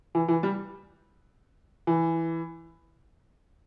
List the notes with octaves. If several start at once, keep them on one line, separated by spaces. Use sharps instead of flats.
E3
E3
G3
E3